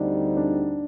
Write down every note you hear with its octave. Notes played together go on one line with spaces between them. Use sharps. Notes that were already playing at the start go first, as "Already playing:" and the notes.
Already playing: D2 D3 G3 C4 D4 D#4
D4